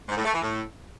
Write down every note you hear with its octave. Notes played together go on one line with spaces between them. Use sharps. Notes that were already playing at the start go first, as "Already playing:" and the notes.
G#2
A2
A3
E3
A2